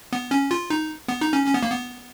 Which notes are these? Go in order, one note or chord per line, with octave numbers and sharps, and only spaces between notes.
B3
C#4
F4
D#4
B3
D#4
C#4
C#4
B3
A#3
B3